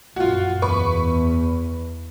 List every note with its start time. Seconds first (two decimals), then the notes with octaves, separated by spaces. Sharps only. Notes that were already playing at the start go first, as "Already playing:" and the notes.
0.16 A#1 F#2 F4 F#4
0.62 E2 B4 B5 C#6